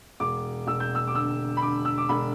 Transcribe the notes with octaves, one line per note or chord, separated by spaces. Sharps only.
E1 D6
E1 E6
G6
E6
D6
D3 E6
B5
D3 D6
E6
D6
E1 B5